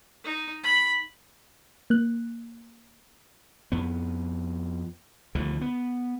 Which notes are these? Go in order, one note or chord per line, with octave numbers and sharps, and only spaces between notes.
D#4
B5
A#3 F#6
F2 B3
D2 D3 D#3 F3
B3